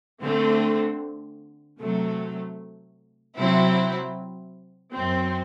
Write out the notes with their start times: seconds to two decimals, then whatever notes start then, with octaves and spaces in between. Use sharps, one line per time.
0.22 D3 A3 C4
1.79 C3 F#3 A3
3.37 C3 F#3 C4 E4
4.95 F#2 F#3 C4